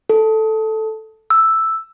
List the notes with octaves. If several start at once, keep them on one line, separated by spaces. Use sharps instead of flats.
A4
E6